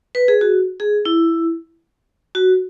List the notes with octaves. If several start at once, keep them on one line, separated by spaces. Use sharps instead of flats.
B4
G#4
F#4
G#4
E4
F#4